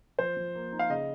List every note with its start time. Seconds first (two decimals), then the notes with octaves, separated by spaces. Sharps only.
0.19 F3 C5
0.37 F3
0.55 A#3
0.72 D#4
0.79 F5
0.90 C#3 D#5